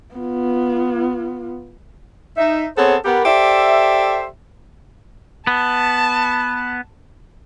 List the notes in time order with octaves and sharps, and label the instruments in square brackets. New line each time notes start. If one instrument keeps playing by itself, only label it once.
[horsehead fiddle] B3 F4
[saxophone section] D#4 E5
B3 C4 G#4 A4 C5 C#5
B3 G4 A#4
G4 A4 C5 D5 E5
[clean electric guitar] B3 [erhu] A5